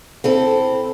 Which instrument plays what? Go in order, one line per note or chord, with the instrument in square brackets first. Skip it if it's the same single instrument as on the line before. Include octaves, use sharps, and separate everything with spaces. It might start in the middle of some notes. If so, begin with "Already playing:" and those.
[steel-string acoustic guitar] C4 E4 A4